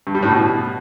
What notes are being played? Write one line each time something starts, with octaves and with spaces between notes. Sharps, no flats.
G2
G3
A2
B2